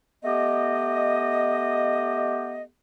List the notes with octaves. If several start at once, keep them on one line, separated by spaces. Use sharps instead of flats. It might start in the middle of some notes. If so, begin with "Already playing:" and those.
A3 B3 G4 D#5